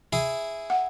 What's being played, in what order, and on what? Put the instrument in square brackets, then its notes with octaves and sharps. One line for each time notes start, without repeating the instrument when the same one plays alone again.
[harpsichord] E4 G#4
[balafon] F#5